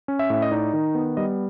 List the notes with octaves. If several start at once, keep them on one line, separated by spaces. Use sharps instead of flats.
C#4
E5
A2 E5
D#5
D#4 D5
D#3
B3
G3 D#5